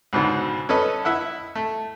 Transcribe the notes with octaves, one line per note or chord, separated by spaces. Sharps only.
C#2 G#2 B2 D3
C#4 A4 B4 D#5
E4 E5 F#5
A3